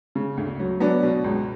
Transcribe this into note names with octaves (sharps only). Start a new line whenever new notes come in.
C#3
D2
F#3
F#3 B3 D4
B2
C#2